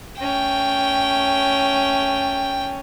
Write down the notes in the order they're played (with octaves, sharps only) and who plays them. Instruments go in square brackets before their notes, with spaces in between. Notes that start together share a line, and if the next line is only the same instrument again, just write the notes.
[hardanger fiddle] A3 C#4 [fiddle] G5